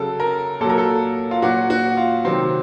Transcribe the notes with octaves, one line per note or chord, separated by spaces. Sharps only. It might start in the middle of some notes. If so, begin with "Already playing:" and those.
Already playing: C#3 F#3 A4
A#4
A#2 F#3 A4
A#4
A4
F4
A#2 F#3 F#4
F#4
F4
C3 D#3 F#3 C4